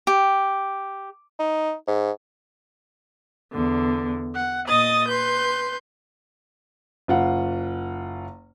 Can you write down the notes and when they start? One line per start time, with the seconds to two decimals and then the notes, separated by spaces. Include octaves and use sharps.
0.07 G4
1.39 D#4
1.87 G#2
3.54 E2 D3
4.35 F#5
4.68 A#2 D#5 D#6 A6
5.09 B4 C6 G6
7.08 F#1 F4 F#5